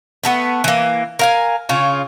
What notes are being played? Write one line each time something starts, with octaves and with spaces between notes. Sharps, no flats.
A3 B3 A4 B4
E3 A#3
A#4 F5 G#5
C#3 F4 C#5